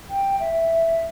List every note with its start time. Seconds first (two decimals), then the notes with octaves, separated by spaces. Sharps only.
0.10 G5
0.40 E5